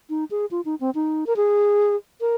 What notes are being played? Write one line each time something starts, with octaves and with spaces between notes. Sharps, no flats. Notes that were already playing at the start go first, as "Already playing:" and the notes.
D#4
G#4
F4
D#4
C4
D#4
A#4
G#4
A#4